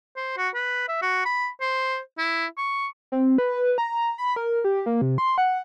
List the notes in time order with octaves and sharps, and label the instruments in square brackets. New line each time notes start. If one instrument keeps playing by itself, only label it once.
[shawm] C5
F#4
B4
E5
F#4
B5
C5
E4
C#6
[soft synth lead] C4
B4
A#5
B5
A#4
G4
A#3
C3
C6
F#5